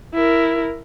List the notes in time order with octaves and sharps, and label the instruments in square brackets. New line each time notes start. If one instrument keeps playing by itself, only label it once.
[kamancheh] E4 A#4